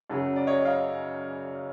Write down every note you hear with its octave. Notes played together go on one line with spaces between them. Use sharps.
F#2 C#3 F#3
D5
C#5 D#5
D#5 F5